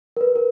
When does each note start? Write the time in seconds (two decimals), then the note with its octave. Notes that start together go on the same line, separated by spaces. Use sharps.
0.17 A#4
0.21 B4
0.36 A#4